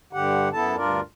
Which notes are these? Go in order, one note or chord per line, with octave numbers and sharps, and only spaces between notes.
G2 D3 G4 F#5
F#2 B3 E4 A4 A5
D2 G2 D4 F4 A#4 D5